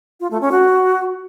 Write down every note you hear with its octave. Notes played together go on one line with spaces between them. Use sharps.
F4
A3
C#4
F#4